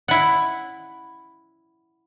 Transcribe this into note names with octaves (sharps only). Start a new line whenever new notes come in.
E4 F#5